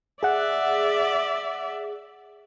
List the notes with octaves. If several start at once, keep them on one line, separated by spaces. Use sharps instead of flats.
G#4 D5 E5 F#5